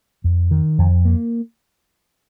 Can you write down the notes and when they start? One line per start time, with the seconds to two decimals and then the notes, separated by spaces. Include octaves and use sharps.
0.24 F2
0.51 D#3
0.78 F2
1.05 A#3